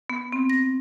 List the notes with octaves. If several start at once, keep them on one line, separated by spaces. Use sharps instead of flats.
B3
C4
A#6